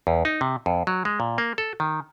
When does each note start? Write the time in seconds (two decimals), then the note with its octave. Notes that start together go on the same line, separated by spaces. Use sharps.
0.07 E2
0.25 D#4
0.41 C3
0.66 F2
0.87 F#3
1.05 G#3
1.20 A#2
1.38 A#3
1.58 A4
1.80 D#3